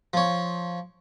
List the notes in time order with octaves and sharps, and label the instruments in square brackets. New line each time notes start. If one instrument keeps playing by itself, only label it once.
[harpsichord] F3 C#5